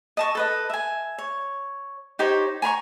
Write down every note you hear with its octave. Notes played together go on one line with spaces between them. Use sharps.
D#5 A5 C#6
A4 B4 D#5
E5 G#5
C#5
D#4 G4 C5 C#5
G#5 A#5 B5 C#6